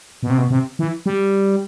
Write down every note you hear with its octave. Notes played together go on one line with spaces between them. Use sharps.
B2
C3
B2
C3
E3
G3